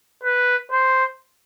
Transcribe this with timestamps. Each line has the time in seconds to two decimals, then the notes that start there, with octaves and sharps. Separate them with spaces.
0.23 B4
0.72 C5